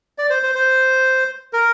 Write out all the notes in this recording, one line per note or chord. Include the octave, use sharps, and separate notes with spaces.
D5
C5
C5
C5
A#4